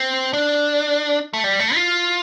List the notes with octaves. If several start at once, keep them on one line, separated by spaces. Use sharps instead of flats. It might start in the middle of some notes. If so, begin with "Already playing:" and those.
Already playing: C4
D4
A3
G3
A3
F4